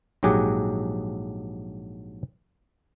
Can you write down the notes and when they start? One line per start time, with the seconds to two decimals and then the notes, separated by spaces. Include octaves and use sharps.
0.23 A#1 G#2 F#3 G4 G#4 F#5